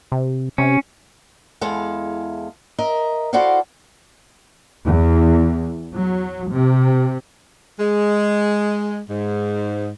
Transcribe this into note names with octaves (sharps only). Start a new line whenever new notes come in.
C3
C3 C#4
E2 G#3 E4 A4 F5
A#4 D#5 E5
E4 F#4 A4 C5 D5 F5
E2
F#3
C3
G#3
G#2